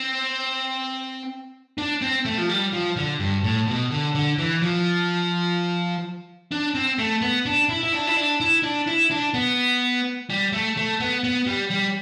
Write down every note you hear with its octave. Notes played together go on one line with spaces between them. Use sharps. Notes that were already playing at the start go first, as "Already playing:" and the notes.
Already playing: C4
D4
C4
A3
F3
G3
F3
D3
G2
A2
B2
D3
D3
E3
F3
D4
C4
A3
B3
D4
E4
E4
D4
E4
D4
E4
D4
E4
D4
B3
G3
A3
A3
B3
B3
G3
G3